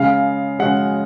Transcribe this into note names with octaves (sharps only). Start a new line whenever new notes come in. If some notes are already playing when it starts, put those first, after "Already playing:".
Already playing: C#3 G#3 F5
C#3 G#3 F#5